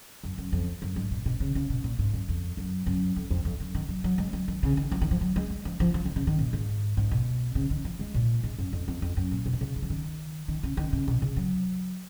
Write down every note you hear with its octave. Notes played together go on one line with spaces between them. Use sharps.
F#2
F#2
F2
F#2
G#2
A#2
B2
C#3
C#3
B2
A#2
G#2
F#2
F2
F#2
F#2
F2
F2
F2
F#2
D#3
F#3
F#3
G#3
F#3
D#3
C#3
D#3
F3
D#3
F3
F#3
G#3
G#3
F3
F3
F3
D#3
C#3
D#3
A#2
G#2
G#2
B2
C#3
D#3
F3
G#3
A#2
G#2
F#2
F2
F2
F2
F#2
A#2
B2
D#3
C#3
F#3
F3
D#3
D#3
C#3
D#3
C#3
B2
C#3
F#3